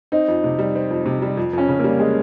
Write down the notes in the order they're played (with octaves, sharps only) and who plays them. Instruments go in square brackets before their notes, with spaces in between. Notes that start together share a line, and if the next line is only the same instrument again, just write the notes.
[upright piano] C4 [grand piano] D#4
[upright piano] F2
C3
G3
C4
F2
C3
G3
F2
[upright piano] F2 [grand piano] C#4
[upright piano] C#3
[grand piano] A#3
[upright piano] G3
[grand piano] G#3